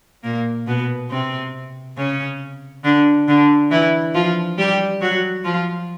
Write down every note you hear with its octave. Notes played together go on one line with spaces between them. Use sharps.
A#2 A#3
B2 B3
C3 C4
C#3 C#4
D3 D4
D3 D4
E3 E4
F3 F4
G3 G4
F#3 F#4
F3 F4